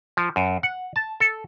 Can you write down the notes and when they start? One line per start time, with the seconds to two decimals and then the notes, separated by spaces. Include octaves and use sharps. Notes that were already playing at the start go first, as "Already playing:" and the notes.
0.17 F3
0.36 F#2
0.63 F#5
0.96 A5
1.20 A4